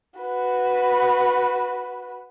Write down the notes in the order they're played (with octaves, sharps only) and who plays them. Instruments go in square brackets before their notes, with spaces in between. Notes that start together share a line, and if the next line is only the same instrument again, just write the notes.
[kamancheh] F#4 B4